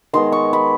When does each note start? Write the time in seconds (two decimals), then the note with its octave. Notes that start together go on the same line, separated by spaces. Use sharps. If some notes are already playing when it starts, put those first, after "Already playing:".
0.13 D#3 G#3 B3 C6
0.32 C#6
0.53 B5